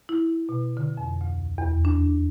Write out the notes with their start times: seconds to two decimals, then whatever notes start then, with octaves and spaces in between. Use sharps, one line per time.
0.09 E4
0.49 B2
0.77 D3
0.97 F2
1.21 D2
1.58 E2
1.85 D4